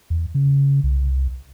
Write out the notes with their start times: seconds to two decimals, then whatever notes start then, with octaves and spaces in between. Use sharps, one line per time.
0.10 E2
0.35 C#3
0.84 C2